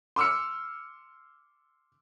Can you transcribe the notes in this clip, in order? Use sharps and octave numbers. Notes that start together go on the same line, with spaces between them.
C6 D6 E6 F6 C#7